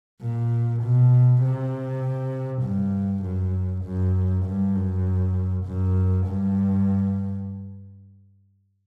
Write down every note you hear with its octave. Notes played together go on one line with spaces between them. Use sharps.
A#2
B2
C3
G2
F#2
F#2
G2
F#2
F#2
G2